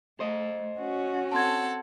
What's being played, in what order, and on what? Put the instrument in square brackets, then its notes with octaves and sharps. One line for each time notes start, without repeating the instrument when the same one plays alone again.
[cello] A3 [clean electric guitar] C5 D#5
[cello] C#4 F#4
[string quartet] C4 A4 F#5 [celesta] A5 C6 G#6